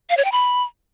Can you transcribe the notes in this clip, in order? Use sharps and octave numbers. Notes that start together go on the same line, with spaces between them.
F5
C#5
G5
B5